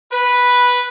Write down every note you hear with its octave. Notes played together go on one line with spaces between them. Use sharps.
B4